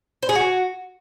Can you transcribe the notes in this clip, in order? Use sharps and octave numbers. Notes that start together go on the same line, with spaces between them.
C5
G#4
F#4